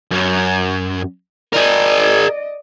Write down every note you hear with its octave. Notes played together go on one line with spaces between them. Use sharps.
F#2
G#4 A#4 D5 D#5